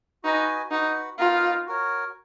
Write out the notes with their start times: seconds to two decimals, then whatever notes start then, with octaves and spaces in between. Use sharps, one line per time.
0.24 D#4 F#4 B4 D#5 G#5
0.71 D#4 F#4 B4 F#5
1.18 B3 D#4 F4 A#4 D#5
1.66 F#4 A#4 C#5